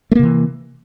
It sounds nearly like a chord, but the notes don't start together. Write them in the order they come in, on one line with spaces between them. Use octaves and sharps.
A3 A#3 C3 E3